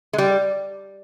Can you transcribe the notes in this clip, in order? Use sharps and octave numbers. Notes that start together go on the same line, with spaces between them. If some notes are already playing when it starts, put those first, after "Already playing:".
G#3
G3